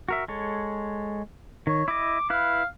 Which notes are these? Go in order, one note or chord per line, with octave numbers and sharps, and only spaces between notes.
F#4 A#4 E5
G#3 A4 C#5
D#3 C#5
E4 D#5 D6
E4 B4 F5